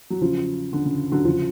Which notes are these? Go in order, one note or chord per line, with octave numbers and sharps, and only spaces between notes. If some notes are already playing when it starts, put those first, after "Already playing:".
F#3
C#3 F3
D3
C#3
D3 F#3
C#3 F3